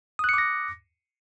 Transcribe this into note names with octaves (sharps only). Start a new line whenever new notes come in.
D6 D#6 F#6 A#6 C#7